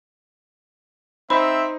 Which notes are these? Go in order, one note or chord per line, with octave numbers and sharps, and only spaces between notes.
C4 D#4 C5 E5 B5